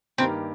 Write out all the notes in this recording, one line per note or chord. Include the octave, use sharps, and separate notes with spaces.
G2 D#3 A#3 C4 G4 A#4